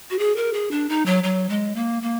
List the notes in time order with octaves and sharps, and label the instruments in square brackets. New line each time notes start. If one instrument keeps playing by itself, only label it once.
[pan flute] F#4
G#4
A#4
G#4
D4
D#4
F#3
F#3
G#3
A#3
A#3